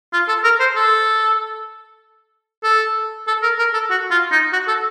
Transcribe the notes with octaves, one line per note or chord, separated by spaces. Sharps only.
F4
A4
A#4
C5
A4
A4
A4
A#4
A#4
A4
F#4
F4
D#4
F#4
A4